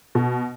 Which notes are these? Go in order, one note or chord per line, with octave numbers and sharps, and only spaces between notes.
B2